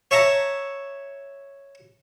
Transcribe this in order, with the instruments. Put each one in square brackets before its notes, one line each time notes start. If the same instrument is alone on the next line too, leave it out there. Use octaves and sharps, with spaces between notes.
[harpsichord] C#5 E5 A5 A#5